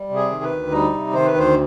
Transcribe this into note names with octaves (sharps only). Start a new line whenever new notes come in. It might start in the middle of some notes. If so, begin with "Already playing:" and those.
Already playing: G3
C3
G#4
D#3
B4
D2
G3 D#4
C3
D#3 C5
B4
D2 C5